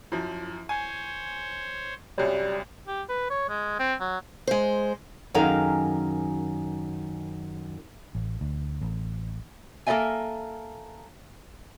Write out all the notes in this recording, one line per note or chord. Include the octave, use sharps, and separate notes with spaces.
F#2 F3 E4
C5 C#5 G#5
C2 F#2 G3 C#5 G5
G4
B4
C#5
G#3
C4
F#3
G#3 C5
F#2 D#3 G#4 A#4 F5
A1
D2
A1
A#3 A4 A#4 D#5 E5 G#5